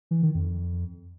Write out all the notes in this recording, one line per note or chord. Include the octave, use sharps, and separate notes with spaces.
E3
D#3
F2